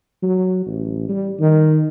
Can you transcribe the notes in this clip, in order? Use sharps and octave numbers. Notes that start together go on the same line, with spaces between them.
F#3
A1
G3
D#3